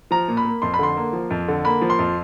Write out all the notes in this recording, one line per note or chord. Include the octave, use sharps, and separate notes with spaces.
F3 A#5
A#2
B5
A#3
F2 C6
B5
D3 C6
A#3
F3
F2
D3
A#3 B5
F3
C6
F2